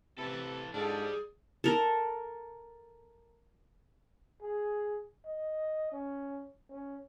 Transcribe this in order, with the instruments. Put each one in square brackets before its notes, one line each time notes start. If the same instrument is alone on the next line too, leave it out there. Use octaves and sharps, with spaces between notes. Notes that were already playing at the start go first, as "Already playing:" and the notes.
[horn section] C3 E4 [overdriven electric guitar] E3 A4 [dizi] B4
[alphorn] G#2 [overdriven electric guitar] G3 [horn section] D4 F4 A4 [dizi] G#4
[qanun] A4 A#4
[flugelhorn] G#4
D#5
C#4
C#4